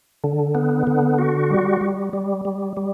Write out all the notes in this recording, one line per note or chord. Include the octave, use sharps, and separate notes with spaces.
D3
B3
D3
F#4
G3
G3
G3
G3
G3